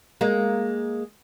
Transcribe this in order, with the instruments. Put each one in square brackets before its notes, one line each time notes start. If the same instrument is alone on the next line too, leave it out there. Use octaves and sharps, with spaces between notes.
[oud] G#3 A#3